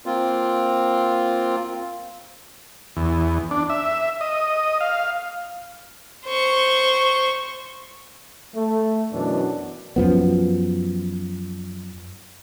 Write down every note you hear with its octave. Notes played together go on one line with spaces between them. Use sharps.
A#3 C4 F4
E2
D4
E5
D#5
F5
C5 C#6
A3
F#2 B2 E3 D4
F#2 F3 B3